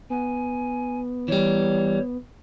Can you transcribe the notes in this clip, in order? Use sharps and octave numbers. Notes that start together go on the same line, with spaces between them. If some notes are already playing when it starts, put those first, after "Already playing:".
B3 G#5
E3 G3 C#5